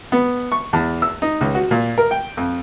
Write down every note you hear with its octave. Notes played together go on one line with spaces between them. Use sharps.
B3
C#6
E2
E6
D#4
C#2
F#4
A#2
A#4
G5
F2